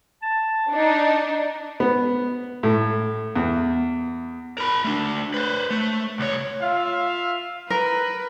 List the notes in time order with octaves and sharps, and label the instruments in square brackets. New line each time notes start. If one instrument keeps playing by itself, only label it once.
[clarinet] A5
[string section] D4 D#4
[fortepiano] B3
A2
E2
[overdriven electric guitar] A#4 B5
A3 D4
B4 C5
A3
C2 C#5
[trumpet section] F4 E5 F5
[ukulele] A#4 [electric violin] B4